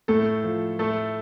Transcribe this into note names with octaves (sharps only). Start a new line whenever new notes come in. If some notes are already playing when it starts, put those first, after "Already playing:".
A2 A3 A4
F3
A2 A3 A4